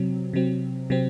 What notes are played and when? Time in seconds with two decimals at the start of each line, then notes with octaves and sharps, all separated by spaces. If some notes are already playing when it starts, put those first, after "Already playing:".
Already playing: C3 F#3 C4
0.33 C3 F#3 C4
0.90 C3 F#3 C4